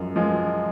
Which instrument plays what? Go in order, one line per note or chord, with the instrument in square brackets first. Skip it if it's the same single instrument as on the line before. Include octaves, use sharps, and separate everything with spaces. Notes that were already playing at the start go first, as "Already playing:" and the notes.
Already playing: [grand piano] F#2 F3 G#3
F3 G#3